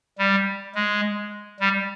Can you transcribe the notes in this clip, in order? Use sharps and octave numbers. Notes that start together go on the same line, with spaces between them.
G3
G#3
G3